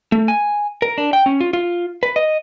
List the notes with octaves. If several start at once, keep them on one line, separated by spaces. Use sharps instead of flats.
A3
G#5
A#4
D4
G5
C#4
F4
F4
B4
D#5